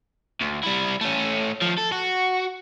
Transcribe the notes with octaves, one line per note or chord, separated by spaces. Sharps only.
D2
G3 E4
A3 C#4
D#3 F3
A4
F#4